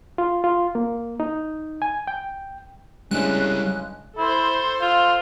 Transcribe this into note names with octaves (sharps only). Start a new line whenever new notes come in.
F4
F4
A#3
D#4
G#5
G5
G2 C#3 G3 G#3 C#4 E4 F#6
E4 A4 C5
F4